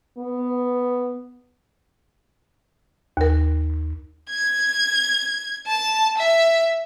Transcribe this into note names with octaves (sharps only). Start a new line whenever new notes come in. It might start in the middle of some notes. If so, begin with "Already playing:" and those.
B3
D#2 A#4
G#6
A5
E5